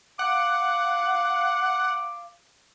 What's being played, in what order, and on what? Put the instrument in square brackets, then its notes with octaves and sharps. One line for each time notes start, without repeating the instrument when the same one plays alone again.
[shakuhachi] F5 [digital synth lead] F#5 [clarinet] D6